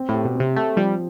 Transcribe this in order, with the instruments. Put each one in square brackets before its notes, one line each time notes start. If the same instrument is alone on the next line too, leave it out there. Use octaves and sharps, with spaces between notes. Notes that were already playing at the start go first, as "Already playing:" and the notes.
Already playing: [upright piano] C4
[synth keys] A2 [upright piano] G4
[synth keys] B2
[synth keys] C3 [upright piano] C4
[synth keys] A3 [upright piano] G4
[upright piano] F3 [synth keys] G3